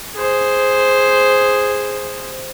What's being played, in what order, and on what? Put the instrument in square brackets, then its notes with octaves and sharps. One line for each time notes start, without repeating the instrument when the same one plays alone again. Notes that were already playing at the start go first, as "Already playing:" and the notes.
[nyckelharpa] G#4 C5